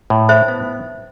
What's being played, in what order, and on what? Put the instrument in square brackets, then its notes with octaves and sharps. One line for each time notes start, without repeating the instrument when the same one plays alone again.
[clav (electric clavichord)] A2
[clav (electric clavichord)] E4 [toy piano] C5 E5
[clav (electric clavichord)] B3